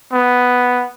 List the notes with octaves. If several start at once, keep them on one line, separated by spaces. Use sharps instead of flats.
B3